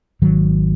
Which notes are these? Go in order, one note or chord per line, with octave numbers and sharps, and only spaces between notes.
G#1 G#2 D#3 F#3